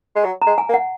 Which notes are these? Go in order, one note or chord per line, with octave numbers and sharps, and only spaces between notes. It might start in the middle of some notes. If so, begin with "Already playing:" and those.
G#3
F#3
G#3 A#5
G#5
A#3
F#5